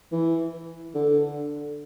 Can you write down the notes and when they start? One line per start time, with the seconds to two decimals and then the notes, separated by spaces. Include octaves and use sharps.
0.12 E3
0.95 D3